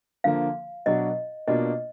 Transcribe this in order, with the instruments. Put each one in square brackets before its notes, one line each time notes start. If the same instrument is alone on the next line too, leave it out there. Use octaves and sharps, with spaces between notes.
[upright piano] D3 F3 A#3 [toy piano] F5
[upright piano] B2 F#3 D4 F#4 [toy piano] D#5
[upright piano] B2 A#3 D4 F4 [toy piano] D#5